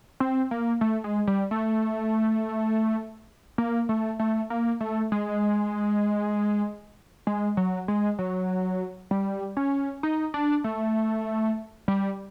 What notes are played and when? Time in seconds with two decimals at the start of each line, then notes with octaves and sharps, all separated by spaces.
0.20 C4
0.51 A#3
0.81 A3
1.04 G#3
1.27 G3
1.51 A3
3.58 A#3
3.89 A3
4.19 A3
4.50 A#3
4.81 A3
5.12 G#3
7.27 G#3
7.57 F#3
7.88 G#3
8.19 F#3
9.11 G3
9.57 C#4
10.03 D#4
10.34 D4
10.64 A3
11.88 G3